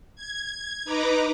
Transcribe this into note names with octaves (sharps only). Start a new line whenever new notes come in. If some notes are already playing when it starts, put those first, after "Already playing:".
G#6
D#4 B4 A#5 D6